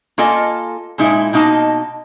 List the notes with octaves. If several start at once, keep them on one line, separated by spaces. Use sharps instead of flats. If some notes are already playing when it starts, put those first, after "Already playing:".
A#3 F4 A4 D#5 G#5
A#2 G#3 D#4 E4
B2 A#3 D#4 D#5 A5